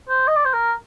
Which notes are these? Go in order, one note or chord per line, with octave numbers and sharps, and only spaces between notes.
C5
D#5
D5
C5
A#4